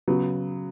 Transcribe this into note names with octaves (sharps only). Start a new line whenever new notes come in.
C#3 F#3 B3